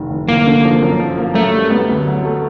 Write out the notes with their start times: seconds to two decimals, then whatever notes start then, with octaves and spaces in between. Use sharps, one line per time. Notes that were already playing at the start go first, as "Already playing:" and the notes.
Already playing: F1 D#3
0.11 F1
0.29 G1 A#3
0.46 D3
0.65 F3
0.83 F#2
0.99 F3
1.18 A#3
1.35 F#2 A3
1.53 G3
1.70 B3
1.89 D2
2.07 F#3
2.25 A3